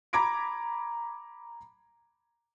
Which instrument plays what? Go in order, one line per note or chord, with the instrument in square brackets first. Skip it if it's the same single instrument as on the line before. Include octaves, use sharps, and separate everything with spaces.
[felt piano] A#5 B5 D6 G#6 A#6 D7